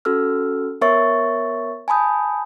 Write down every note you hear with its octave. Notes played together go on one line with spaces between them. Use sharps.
C#4 F#4 A4 E6 F6
B3 A#4 C#5 E5 C#6 A6
G#5 A5 B5 D#6 G6